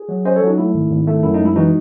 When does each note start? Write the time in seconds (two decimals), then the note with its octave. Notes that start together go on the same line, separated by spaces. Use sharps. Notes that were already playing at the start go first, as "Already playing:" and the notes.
Already playing: G#4
0.09 F#3
0.25 C#4 C5 D#5
0.36 A4 C#5
0.42 F#3
0.47 D#4 F#4
0.58 A3 E4
0.74 G#1
0.90 G#1
1.07 A3
1.23 F#2 E4
1.34 D#4
1.40 G#3
1.45 E4
1.56 E3 D#4 F#4